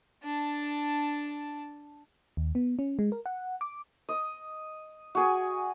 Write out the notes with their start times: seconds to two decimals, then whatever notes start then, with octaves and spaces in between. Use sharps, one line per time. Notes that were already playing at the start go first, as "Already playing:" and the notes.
0.23 D4 A5
2.37 D#2
2.55 B3
2.79 C#4
2.99 G#3
3.12 A#4
3.26 F#5
3.61 D6
4.09 D#5
5.15 F#4 G#4 G#5